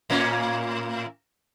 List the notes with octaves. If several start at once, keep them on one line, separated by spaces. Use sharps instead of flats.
A2 A#3 C#4